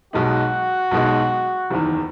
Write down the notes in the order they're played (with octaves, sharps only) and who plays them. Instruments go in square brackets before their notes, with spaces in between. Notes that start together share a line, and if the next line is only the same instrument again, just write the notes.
[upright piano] B1 B2 G#3 D#4 [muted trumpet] F#4
[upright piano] B1 B2 G#3 D#4
F#1 E2 D#3